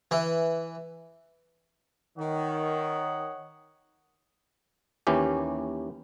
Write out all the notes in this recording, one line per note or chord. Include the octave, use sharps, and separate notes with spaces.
E3
D#3 C#5 D#5 F#5
D#2 E3 C#4 G4